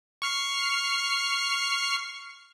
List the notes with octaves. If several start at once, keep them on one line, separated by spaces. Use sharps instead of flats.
C#6 F6 C7